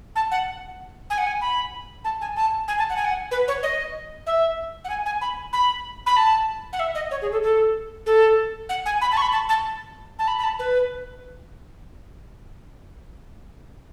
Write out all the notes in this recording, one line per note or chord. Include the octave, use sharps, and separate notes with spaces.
A5
F#5
G#5
F#5
G#5
B5
A5
G#5
A5
G#5
A5
F#5
G#5
F#5
B4
C#5
D#5
E5
F#5
G#5
G#5
B5
B5
B5
A5
F#5
E5
D#5
C#5
G#4
A4
A4
A4
F#5
G#5
B5
A5
C#6
B5
A5
A5
A5
B5
B5
A5
B4